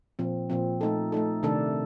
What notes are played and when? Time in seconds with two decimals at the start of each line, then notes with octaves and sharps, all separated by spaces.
0.19 A#2 F3 C4
0.50 A#2 F3 C4
0.81 A3 D#4 A4
1.12 A3 D#4 A4
1.43 C3 D#3 A3 D4 A4